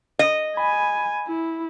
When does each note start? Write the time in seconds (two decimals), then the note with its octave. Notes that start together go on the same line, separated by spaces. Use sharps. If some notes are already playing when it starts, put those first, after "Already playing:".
0.19 D#5
0.57 G#5 B5
1.27 E4